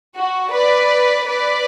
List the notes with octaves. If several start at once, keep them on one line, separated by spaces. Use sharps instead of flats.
F#4
B4 D5
B4 D5